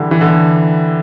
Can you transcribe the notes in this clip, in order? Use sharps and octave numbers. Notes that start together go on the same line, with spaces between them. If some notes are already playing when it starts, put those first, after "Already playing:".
Already playing: D3 E3 G3
E3
D3